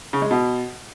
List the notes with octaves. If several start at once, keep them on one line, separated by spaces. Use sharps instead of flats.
C#3
G#3
B2